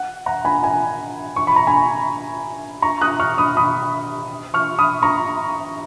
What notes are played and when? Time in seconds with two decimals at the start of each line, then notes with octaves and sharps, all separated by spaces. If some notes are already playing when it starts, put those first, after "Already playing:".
Already playing: F#5
0.26 F#5 A#5
0.45 G#5 B5
0.63 G#5 B5
1.36 C#6
1.47 B5
1.56 A#5
1.67 G#5 B5
2.82 A#5 C#6
3.01 D#6 F#6
3.19 C#6 F6
3.38 B5 D#6
3.57 B5 D#6
4.54 C#6 F6
4.79 B5 D#6
5.03 A#5 C#6